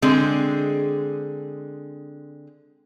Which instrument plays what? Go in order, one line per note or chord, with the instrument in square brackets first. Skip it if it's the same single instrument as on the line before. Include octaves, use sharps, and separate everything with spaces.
[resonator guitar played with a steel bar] D3 G#3 C4 G#4